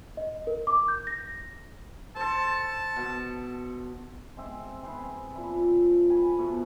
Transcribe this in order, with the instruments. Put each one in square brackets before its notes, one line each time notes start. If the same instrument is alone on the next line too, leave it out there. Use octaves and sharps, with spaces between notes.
[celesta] D#5
A#4
D6
G6
A#6
[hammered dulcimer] A4 C5 [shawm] A5
[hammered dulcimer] B2
G#3 C4 E5
C4 E4 G#4 B4
A#2 F3 E4
A4 G#5 B5
B2 F3 A3